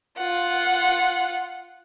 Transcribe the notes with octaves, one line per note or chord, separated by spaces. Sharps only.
F4 F#5